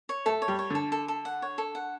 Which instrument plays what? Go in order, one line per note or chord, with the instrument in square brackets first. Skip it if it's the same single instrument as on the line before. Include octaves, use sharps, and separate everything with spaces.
[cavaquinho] C#5
[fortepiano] A3 [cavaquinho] A4
[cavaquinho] C#5
[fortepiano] G3
[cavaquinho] C#5
[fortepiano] D3 [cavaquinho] A4
[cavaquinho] A4
A4
F#5
C#5
A4
F#5